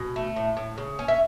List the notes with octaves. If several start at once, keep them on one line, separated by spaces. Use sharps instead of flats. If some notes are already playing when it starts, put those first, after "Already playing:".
Already playing: B2 G#5
A3
A2
A2
C#3
C#4
E5